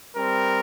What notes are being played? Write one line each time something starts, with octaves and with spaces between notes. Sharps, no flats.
G3 C4 A#4